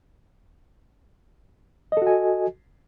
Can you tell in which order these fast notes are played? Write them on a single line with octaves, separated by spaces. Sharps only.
D#5 A4 F#4 G#5